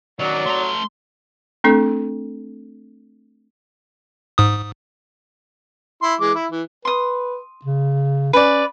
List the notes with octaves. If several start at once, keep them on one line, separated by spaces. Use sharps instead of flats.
D#3 F#3 C#4 D5
A3 A#5 C6
A3 C4 D4 A4
G#2 D#6
E4 C6
E3 G#3 D6
E4
E3
B4 C6 D#6
C#3
C#4 B4 D5